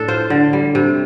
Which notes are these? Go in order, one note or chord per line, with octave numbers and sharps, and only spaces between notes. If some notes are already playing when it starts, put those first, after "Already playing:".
Already playing: A2 D4 A4
F4 C5
D3
G3
C3